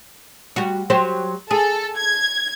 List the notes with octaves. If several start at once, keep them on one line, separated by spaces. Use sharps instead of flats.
G3 F#4
F#3 G4 C5
G#4 A4
G#6